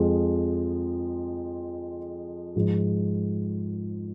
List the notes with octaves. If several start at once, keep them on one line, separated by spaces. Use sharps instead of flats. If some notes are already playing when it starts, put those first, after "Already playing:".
Already playing: F2 F3 G#3
G#2 F3 G#3